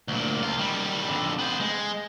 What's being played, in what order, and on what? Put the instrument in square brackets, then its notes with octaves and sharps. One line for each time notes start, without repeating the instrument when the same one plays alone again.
[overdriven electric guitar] D2 A#2
C#2 F4
D#3 G3
F2 D3
B3 C5
G#3